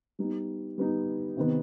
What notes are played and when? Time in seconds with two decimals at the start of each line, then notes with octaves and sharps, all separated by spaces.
0.19 G3 B3 D#4
0.78 G3 B3 D#4
1.37 C3 D#3 B3